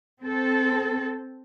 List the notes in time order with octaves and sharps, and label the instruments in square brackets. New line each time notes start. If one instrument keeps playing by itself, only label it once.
[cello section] C4 A4